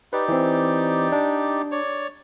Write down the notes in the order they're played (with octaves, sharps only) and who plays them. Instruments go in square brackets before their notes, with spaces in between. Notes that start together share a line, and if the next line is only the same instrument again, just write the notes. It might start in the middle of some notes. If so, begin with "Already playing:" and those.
[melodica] D#4 G4 D5 [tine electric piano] B4
[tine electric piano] E3 C4
D4
[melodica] C#5 D5